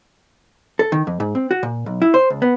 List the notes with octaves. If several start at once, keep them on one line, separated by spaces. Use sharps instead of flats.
A4
D#3
F2
G#2
C4
F#4
A#2
B1
E4
C5
C#2
B3